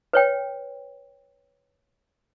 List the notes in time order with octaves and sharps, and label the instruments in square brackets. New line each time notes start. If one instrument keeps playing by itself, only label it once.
[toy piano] B4 C#5 G5